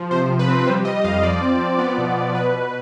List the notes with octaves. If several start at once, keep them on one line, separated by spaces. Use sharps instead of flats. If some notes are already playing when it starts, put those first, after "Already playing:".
Already playing: F3
C3 C5
C3
B4
C4
G3 C5
G3 D#5
F2 F5
F3 D5
C4
F3
B3 D5
B2
B2
B2 B4
B2